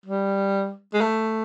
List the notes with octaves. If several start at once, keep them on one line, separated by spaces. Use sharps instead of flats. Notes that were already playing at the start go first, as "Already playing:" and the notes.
G3
G#3
A3